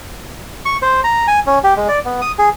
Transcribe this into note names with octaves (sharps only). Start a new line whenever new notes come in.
C#6
C5
A#5
G#5
C#4
G4
G#3
D5
B3
D#6
G#4